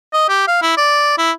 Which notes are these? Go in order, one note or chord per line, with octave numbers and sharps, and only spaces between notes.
D#5
G4
F5
E4
D5
E4